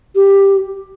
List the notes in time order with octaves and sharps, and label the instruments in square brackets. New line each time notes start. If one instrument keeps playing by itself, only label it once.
[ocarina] G4